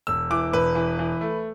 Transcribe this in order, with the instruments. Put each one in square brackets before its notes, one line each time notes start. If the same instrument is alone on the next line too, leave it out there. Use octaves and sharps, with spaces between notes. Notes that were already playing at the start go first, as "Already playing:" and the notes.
[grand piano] E1 E6
E3 D6
E1 B4
E3
E3
A3